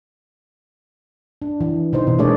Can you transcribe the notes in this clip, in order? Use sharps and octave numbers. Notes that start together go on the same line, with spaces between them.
D4
E3
C3 E3 D#4 C5
B2
G#3 A#3 D4 G#4 C#5 D5